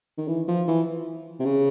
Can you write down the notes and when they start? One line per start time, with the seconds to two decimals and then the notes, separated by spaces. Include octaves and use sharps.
0.18 D#3
0.28 E3
0.48 F3
0.67 E3
1.39 C3
1.45 C#3